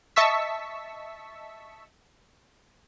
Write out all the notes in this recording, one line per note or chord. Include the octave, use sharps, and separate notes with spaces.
D#5 E5 A5 C#6 E6 B6